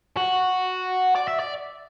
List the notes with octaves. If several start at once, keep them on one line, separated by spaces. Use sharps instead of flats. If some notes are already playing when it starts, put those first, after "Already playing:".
F#4
D5
E5
D5